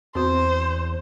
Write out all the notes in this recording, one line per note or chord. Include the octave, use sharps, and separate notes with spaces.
E2 C4 F#4 C5